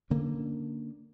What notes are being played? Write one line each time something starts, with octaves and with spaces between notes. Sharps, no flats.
D3 A#3 C#4